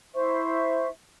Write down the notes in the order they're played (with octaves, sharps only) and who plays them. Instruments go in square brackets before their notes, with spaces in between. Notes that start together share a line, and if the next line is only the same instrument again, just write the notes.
[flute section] E4 C5 E5 C#6